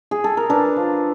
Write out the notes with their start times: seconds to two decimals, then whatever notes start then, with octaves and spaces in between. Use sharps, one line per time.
0.11 G#4
0.24 A4
0.37 A#4
0.50 D4 A4 B4
0.76 F3